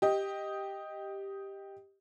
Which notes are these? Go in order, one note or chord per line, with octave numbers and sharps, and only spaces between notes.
G4 D#5